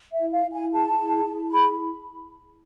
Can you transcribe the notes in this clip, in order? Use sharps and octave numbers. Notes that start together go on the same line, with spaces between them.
E5
E4
F5
E4
G#5
G#4 A5
E4
E4
G#4 B5